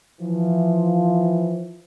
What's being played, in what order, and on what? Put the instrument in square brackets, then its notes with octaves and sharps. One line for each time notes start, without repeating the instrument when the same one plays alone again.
[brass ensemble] E3 F3